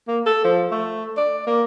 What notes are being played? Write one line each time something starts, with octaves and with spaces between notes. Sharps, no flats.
A#3
A4
F3
A3
D5
A#3